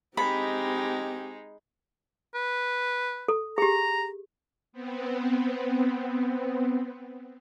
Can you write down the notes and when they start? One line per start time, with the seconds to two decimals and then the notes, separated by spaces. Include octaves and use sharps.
0.17 G#3 C4 D#4 G4 B5
2.35 B4
3.28 A4
3.58 G4 G#4 A#5
4.73 B3 C4